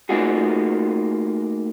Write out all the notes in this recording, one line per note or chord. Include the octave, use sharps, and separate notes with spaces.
A3 A#3 D#4 F4 F#4 G#4